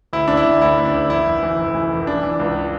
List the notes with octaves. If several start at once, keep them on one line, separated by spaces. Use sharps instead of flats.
D2 E4
D2 D4
E4
D2
D2 E4
D2
D4
D2
F1 E4
F1
E3
F1
E3
F1
E3 D4
E3
C#2